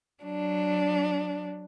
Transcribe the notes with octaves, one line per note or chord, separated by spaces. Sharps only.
F#3 D4